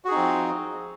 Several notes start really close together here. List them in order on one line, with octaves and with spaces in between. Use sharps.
F#4 G#4 D#4 C4 F3